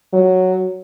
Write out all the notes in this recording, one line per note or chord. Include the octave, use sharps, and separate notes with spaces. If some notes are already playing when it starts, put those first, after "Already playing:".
F#3